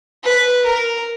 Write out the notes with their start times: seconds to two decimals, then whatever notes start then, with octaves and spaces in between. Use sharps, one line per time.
0.24 B4
0.65 A#4